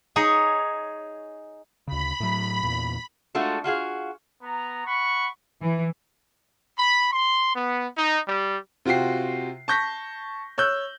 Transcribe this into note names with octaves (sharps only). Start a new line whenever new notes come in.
D#4 G#4 C#5
D2 C#3 B5
A2 F#3
E2 A#2
G#3 A3 D4 F4 F#4 A4
F4 F#4 G#4 F5
B3 A#5
F#5 B5 C#6
E3
B5
C6
B3
D#4
G3
C3 F4 F#4 G5 C7
A5 C#6 G6 A#6 B6
C#5 E6 F#6 G6